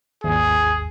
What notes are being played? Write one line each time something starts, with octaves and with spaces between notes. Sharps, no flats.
G#1 D#2 G#4